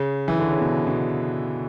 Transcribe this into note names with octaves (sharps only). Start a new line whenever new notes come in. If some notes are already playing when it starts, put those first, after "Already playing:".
Already playing: C#3
E3
D3
C#3
B2
B2